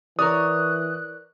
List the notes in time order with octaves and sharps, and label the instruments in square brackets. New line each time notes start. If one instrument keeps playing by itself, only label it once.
[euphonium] E3 [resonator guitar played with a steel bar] A#4 C#5 D5 [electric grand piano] D#6 [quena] F#6